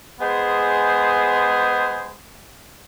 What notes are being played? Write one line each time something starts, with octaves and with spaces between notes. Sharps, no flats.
G#3 B3 G#4 C5